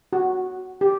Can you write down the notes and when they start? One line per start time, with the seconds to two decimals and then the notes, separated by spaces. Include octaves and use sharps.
0.13 F#4
0.81 G4